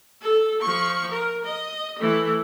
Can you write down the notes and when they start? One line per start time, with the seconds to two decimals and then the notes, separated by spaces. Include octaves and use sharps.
0.21 A4
0.62 F3 C#6
1.11 A#4
1.45 D#5
1.99 E3 A3